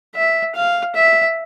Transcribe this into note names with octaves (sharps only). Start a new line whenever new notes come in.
E5
F5
E5